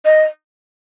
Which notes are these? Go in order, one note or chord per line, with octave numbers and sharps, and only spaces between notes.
D#5